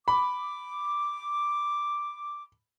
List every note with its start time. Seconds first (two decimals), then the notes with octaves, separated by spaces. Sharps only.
0.08 B5 D6